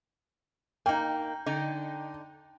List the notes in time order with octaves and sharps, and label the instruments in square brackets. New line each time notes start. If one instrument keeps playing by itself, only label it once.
[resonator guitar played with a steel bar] A#3 D#4 [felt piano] G5
[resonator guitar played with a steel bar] D3 D#4